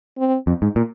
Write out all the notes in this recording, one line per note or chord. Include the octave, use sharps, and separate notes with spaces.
C4
F2
G#2
A#2